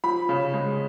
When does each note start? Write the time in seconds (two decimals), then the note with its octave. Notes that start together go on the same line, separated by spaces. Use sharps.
0.04 F3 B5
0.29 C#3
0.53 G#3